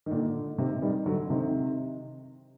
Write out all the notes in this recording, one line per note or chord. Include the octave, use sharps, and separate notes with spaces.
D#3
A#2 D3
C3 D#3
D#3 G3
D3 F#3
C3 D#3